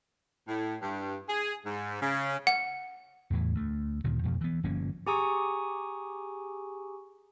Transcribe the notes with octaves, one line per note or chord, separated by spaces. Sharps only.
A2
G2
G#4
G#2
C#3
F#5
E2 A2 E3
D2 A3
D2 G2 A#2 D#3
F2 B2 F3
E3 B3
G1 F3 A#3 C#4
G4 G#4 G#5 A#5 C#6 D#6